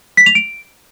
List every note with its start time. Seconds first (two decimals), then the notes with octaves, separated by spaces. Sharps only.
0.17 B6
0.26 F7
0.35 D7